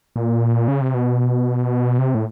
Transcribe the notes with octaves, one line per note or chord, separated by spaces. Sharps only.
A#2
C#3
C3
B2
C3
A2